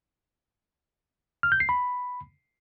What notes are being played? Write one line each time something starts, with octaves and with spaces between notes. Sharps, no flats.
F6
G6
C7
B5